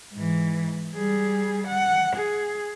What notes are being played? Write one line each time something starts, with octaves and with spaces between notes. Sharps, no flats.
G#2 E3
G3 G#4
F#5
G#4